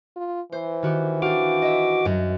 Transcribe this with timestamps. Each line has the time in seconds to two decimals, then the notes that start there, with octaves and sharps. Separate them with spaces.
0.16 F4
0.52 E3 C5
0.83 D#3 F#4 G4
1.22 D4 F#4 G4 F5 D6
1.62 D#5 E5
2.05 F#2 F#3